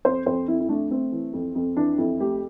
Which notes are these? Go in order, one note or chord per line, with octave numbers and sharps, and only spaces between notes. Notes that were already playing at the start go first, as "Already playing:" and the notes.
F2 C5
F2 C5
F2 E4
E4
A3 D4
A3 C4
E3
F2
F2
E3 D4
F2 E4
A3 G4